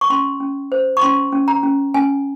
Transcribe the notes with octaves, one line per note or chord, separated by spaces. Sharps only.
C#6
C#4 C6
C#4
C5
C#6
C#4 C6
C#4
A#5
C#4
C#4 G#5